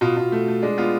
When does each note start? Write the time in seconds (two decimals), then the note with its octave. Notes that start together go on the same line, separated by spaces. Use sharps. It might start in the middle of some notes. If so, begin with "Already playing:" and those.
0.01 B2 F4
0.17 B2
0.32 A3
0.48 A3
0.62 G#3 D4
0.78 B3 F4